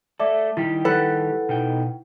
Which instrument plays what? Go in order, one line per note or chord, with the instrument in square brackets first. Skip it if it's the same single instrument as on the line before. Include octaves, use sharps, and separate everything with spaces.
[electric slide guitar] A3 A4 [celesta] D5 E5 D6
[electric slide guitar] D#3 G3 G4 [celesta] E4
[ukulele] A4 B4 F#5
[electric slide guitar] B2 D#4 G5